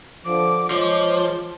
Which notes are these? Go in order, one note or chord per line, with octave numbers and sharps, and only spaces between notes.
D3 F3 D6
F3 G#3 C#5